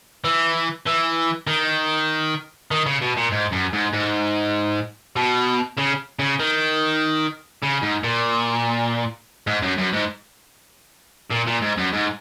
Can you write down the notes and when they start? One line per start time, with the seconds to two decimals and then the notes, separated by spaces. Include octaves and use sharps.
0.24 E3
0.86 E3
1.47 D#3
2.71 D#3
2.86 C#3
3.01 B2
3.17 A#2
3.32 G#2
3.52 F#2
3.73 G#2
3.93 G#2
5.16 B2
5.78 C#3
6.19 C#3
6.39 D#3
7.63 C#3
7.82 G#2
8.04 A#2
9.47 G#2
9.63 F#2
9.78 F#2
9.93 G#2
11.31 A#2
11.47 A#2
11.62 G#2
11.78 F#2
11.93 G#2